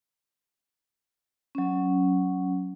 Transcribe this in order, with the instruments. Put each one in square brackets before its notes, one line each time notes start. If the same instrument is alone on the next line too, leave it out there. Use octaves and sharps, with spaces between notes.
[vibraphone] F#3 C#4